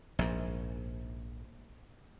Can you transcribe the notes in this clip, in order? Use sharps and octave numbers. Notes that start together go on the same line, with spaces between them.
A#1 G#2